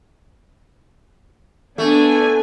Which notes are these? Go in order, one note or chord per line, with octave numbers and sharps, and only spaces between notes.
A3 B3 D4 G#5